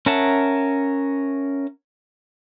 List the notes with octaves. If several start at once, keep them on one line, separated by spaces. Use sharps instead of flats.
C#4 A#4 E5 F#5 A5